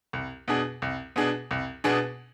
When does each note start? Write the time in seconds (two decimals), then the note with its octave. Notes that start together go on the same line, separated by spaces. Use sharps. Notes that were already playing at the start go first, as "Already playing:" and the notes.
0.13 C2
0.48 B2 B3 D4 G#4
0.82 C2
1.16 B2 B3 D4 G#4
1.51 C2
1.84 B2 B3 D4 G#4